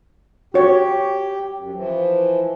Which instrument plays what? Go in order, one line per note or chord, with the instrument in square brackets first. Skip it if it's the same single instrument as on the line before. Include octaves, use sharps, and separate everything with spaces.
[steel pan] F#4 C#5 [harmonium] G4
[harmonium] F#2
E3 F3